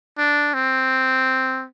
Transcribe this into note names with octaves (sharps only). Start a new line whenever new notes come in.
D4
C4